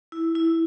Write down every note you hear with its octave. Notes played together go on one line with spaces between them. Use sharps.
E4
E4